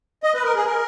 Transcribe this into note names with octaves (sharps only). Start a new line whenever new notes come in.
D#5
B4
A#4
G#4
A#4